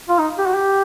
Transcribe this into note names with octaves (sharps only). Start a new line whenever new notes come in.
F4
D#4
G4
F#4
G4